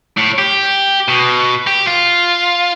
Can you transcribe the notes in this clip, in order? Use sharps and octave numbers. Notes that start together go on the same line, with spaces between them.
A2
G4
B2
G4
F4